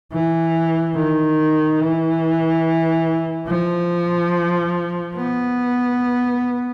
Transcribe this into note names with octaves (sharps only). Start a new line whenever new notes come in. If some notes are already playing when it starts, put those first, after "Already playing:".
E3
D#3
E3
F3
B3